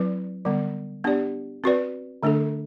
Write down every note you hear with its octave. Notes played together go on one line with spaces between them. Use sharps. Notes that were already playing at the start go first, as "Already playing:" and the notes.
Already playing: F#3 C4 E4 B4 D5
D3 G3 B3
B3 D4 G4 D5
C4 F#4 B4 D5
D3 A3 D4 A4